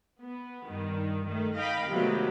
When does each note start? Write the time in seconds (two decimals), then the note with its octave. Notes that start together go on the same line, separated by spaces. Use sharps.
0.22 B3
0.67 G2 D#3
1.27 D#3 A3
1.56 D#5 F5 G5 B5 B6
1.87 C3 D#3 F#3 G#3 A3 B3